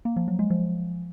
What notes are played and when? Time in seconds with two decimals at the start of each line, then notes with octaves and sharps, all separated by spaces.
0.05 A#3
0.16 F3
0.28 F#3
0.39 G#3
0.50 F3